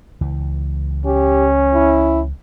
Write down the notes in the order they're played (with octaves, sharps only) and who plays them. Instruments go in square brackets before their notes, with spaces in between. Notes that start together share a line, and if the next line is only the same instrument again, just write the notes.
[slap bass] C#2 E3
[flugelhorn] C#4 [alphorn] G4
[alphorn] E4